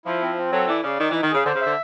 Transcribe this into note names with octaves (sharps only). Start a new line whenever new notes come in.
F3 E4
C4
C4
F#3 A4
E3 D5
C#3 D5
D#3 D#4
E3 D#4
D#3
C#3 G#4
D3 C5
C#3
D3 E5